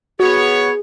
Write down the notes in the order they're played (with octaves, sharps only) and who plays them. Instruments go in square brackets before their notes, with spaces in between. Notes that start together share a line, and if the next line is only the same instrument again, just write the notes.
[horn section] B3 C#5 [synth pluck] F#4 [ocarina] G#4